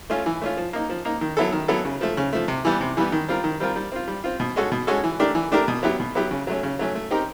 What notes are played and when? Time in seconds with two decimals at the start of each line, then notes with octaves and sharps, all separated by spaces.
0.10 A3 C#4 F4
0.26 E3
0.42 A3 C#4 F4
0.57 F3
0.73 A#3 D#4
0.90 F3
1.05 A#3 D#4
1.21 D#3
1.37 F#3 B3 E4 A4
1.52 D#3
1.68 F#3 B3 E4 A4
1.85 C#3
2.01 F3 A3
2.17 C#3
2.33 F3 A3
2.48 C3
2.65 E3 G3 B3
2.81 C3
2.97 E3 G3 B3
3.12 D#3
3.28 G3 C4 F4 A#4
3.44 D#3
3.60 G3 C4 F4 A#4
3.76 G3
3.92 C4 F4
4.08 G3
4.24 C4 F4
4.40 B2
4.56 G#3 C#4 F#4 A4
4.72 B2
4.87 G#3 C#4 F#4 A4
5.04 E3
5.19 A3 D4 G4 A#4
5.35 E3
5.52 A3 D4 G4 A#4
5.68 B2
5.83 F#3 B3 E4 G4
6.00 B2
6.15 F#3 B3 E4 G4
6.31 C#3
6.47 F#3 A3 C#4
6.63 C#3
6.79 F#3 A3 C#4
6.95 A3
7.11 C4 D#4 G4 A#4